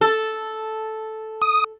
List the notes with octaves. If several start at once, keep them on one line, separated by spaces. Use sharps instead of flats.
A4
D#6